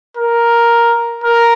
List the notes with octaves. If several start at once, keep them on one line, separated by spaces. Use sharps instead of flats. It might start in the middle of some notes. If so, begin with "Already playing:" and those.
A#4
A#4